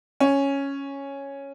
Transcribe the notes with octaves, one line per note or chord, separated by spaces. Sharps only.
C#4